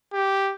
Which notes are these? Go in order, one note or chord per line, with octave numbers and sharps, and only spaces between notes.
G4